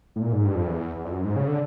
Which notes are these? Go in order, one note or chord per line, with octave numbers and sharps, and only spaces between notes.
A2
A#2
G#2
G2
F2
E2
E2
F2
F#2
G#2
C#3
D3